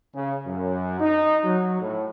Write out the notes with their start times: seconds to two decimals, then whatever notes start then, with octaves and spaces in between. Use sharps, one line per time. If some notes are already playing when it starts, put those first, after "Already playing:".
0.15 C#3
0.47 F#2
1.00 D#4
1.44 F#3
1.81 A2